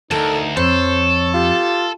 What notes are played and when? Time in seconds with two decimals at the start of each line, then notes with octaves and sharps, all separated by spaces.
0.11 D2 D#4 A4 A#4
0.57 F2 A4 C5 C#5
1.34 F4 G4